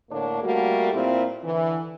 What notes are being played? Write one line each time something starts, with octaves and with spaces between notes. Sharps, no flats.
A2 D3 A#3 D4 C#5
G3 A3 A#3 F#4
A#2 C4 E4 F4
D3 E3